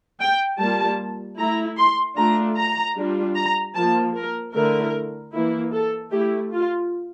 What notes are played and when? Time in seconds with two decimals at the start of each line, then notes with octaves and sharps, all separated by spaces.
0.20 G5
0.59 G3 A#3 F4 A5
1.38 A3 E4 A#5
1.77 C6
2.17 A3 D4 F4 A#5
2.57 A#5
2.96 G3 D4 F4
3.36 A#5
3.75 F3 A#3 F4 A5
4.15 A#4
4.54 D3 A3 E4 A#4
5.33 E3 A#3 E4
5.73 A4
6.12 A3 E4 G4
6.52 F4